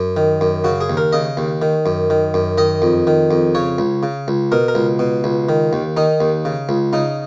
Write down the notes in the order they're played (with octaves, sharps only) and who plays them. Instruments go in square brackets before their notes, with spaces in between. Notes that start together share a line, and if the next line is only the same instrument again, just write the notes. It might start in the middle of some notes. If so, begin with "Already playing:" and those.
Already playing: [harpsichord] F#2
D#3
F#2
C#3 F#4
G#4
D#2
A#4
C#3 D#5
D#2
D#3
F#2
D#3
F#2
D#3 D#5
F2
D#3
F2
C#3 C#5
C#2
C#3
C#2
B2 A#4
A#4
C#2
B2
C#2
D#3
D#2
D#3 D#4
D#2
C#3
C#2
C#3 D#4